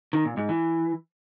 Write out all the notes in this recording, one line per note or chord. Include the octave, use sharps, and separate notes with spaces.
D#3
A#2
G#2
E3